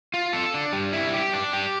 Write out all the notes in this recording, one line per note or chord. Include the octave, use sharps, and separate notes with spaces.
F4
A4
D4
G3
E4
G4
D4
G4